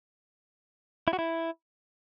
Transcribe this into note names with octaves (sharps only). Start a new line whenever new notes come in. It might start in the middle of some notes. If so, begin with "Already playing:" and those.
E4
F#4
E4